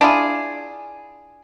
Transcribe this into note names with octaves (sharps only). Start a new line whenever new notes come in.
D4 E4 F4 G#4